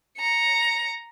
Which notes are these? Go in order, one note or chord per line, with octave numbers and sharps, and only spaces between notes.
A#5 C#7